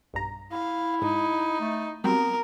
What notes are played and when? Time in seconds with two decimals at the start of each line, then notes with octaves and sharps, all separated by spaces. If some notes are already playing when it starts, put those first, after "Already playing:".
0.13 B1 G2 A#5
0.52 E4 F5
1.02 G#2 D#4
1.61 A3
2.04 F#3 G3 B3 C4 A#4